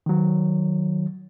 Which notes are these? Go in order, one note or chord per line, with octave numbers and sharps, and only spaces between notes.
D#3 F#3